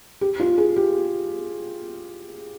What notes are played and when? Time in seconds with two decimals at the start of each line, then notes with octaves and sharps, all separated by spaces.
0.21 G4
0.40 F4
0.58 G#4
0.76 G4